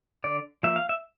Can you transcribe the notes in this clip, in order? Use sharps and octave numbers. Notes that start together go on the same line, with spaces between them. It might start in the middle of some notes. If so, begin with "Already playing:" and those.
D3 D5
F3 A#3 E5
F5
E5